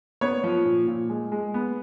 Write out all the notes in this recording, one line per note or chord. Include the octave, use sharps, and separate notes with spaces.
B3 C#5
F3
A#2
A#2
G#3
G#3
B3